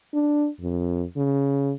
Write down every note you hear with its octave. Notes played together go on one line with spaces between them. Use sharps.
D4
F2
C#3